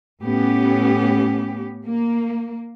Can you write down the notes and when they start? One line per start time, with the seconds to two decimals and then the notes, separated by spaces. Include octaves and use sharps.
0.21 A2 B3 C#4 G4
1.86 A#3